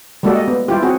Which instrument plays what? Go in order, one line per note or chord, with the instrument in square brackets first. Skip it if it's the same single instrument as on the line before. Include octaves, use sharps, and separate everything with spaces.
[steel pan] G3 G#3 A#3 F#4 A4 D5
D#5
B3
G3 E4 F4 G4
C4 F#4 G#4